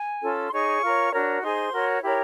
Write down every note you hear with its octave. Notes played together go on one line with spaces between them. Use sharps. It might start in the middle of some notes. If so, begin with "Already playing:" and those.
Already playing: G#5
C#4 F4 A4
C6
D#4 G#4 C#5 C#6
F4 A#4 C#5
D4 F#4 A#4 C#5
D#4 G#4 C5 C6
F#4 A#4 C#5
E4 G4 A#4 C#5 B5